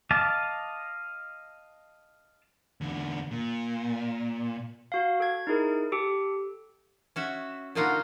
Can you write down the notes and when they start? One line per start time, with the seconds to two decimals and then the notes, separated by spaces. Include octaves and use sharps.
0.11 D#5 F5 A5 D6
2.81 E2 D3
3.31 A#2
4.92 F#4 F5
5.20 A4 G#6
5.47 D#4 E4 G#4 A#4
5.92 G4 A4
7.16 C#4 F#4 E5
7.75 A#2 D3 D#4 F4 F#4 A#5